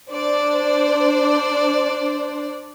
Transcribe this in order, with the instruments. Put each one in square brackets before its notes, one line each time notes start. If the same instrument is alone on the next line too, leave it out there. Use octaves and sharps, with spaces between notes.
[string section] D4 C5 D5